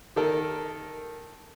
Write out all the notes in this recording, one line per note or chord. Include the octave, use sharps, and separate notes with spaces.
D#3 A4 A#4